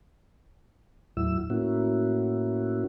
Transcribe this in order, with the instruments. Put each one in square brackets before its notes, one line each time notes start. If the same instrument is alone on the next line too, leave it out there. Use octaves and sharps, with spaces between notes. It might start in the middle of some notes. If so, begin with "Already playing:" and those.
[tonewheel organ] D#2 A2 F#3 E4 E6
A2 A#3 C#4 E4 F#4